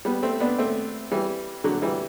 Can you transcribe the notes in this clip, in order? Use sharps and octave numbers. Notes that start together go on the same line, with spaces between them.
G3 B3
A3 C4
B3 D4
A3 C4
E3 G3
D3 F#3
E3 G3